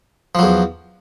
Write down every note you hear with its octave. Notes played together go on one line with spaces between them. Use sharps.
E2 F3 F#3